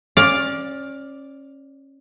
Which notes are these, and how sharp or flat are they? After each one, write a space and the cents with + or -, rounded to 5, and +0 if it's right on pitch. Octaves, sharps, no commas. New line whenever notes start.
C#4 -25 D5 +0 F5 +10